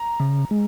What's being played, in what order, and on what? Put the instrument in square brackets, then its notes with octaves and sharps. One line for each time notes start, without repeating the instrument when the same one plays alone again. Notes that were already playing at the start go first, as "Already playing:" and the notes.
Already playing: [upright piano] A#5
[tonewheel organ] C#3
G#3